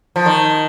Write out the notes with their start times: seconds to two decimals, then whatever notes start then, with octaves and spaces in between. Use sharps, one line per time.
0.16 F3
0.26 D#3